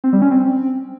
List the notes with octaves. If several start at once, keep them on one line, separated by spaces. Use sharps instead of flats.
C4
G3
C#4
C4